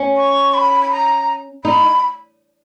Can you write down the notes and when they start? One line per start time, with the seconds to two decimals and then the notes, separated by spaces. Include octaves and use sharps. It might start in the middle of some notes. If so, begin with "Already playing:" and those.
Already playing: C#4
0.17 C#6
0.54 B5
0.81 B5
0.91 A#5
1.65 D#4 B5